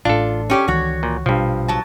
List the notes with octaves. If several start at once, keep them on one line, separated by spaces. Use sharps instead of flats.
A1 A2 D4 F4 A4
C#4 G4 C#5
C#2 D#3 E3 F#4 C#5
A#2
A#1 G2 B2 F3
F#3 A5